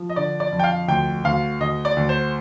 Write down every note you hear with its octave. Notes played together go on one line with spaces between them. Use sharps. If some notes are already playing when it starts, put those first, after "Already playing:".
Already playing: F3
D#5
D3 D5
D5
F2
G5
F5
D2 G5
D2 F5
D2 D#5
D5
D2
C5